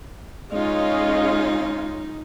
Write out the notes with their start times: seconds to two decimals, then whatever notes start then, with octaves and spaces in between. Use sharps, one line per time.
0.52 G#3 C#4 D#4 F4 D#5